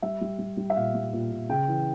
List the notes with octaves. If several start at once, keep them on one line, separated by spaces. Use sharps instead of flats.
G3 E5
G3
G3
G3
E5
A#2 F5
G3
A#2
A#2
C#3 G5
E3